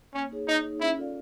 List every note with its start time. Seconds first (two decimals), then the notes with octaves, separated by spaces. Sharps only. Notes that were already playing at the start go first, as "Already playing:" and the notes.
0.14 A#3 C#4
0.31 D#4 G#4 C#5
0.48 A#3 D#4
0.65 D#4 G#4 C#5
0.81 C#4 E4
0.98 F4 A4 D5 F5